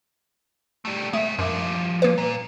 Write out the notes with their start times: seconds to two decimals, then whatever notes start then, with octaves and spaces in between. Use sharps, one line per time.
0.85 G3 A3
1.13 G#3 A3 E5
1.38 F#2 F3 G3
2.02 A#3 B4
2.18 A#2